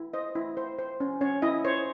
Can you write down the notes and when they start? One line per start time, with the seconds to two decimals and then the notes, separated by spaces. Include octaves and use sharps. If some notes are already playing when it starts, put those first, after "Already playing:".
Already playing: E4
0.14 C5 D#5
0.35 E4
0.57 C5
0.79 C5
1.00 C#4
1.21 C#4 C#5
1.42 E4 D#5
1.65 C5 C#5